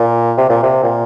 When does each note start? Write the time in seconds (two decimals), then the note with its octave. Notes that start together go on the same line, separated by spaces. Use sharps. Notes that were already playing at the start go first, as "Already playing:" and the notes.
Already playing: A#2
0.37 C3
0.49 A#2
0.63 C3
0.83 A#2